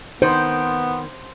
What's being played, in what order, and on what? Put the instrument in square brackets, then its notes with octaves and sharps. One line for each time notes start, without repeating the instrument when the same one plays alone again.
[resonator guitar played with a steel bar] D#3 [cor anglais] B3 [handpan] C5